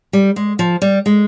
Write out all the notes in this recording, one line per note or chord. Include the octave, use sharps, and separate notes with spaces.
G3
G#3
F3
G3
G#3